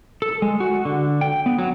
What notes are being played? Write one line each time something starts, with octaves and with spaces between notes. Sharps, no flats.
A4
G#3
F#4
D3
G5
B3
F#3